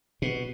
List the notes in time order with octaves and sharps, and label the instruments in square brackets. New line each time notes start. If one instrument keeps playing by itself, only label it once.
[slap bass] B2